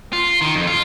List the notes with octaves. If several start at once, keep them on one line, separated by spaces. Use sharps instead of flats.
F4
D#3
F2
F4